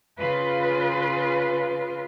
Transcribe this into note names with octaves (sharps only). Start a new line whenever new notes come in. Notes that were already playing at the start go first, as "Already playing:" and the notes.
C#3 F4 B4